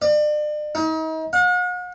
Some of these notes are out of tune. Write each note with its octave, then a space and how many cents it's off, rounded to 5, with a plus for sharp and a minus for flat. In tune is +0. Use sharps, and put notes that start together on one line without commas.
D5 +40
D#4 +40
F#5 -45